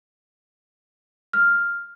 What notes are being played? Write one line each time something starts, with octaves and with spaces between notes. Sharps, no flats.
F6